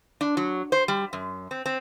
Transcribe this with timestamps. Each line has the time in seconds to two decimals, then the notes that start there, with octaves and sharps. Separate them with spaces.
0.21 D4
0.37 F#3
0.72 C5
0.88 G3
1.13 F#2
1.51 C4
1.66 C4